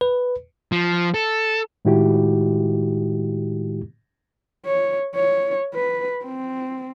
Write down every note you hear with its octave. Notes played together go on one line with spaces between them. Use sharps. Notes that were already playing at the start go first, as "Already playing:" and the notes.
B4
F3
A4
A2 D#3 G#3 E4 F#4 G4
C#5
C#5
B4
C4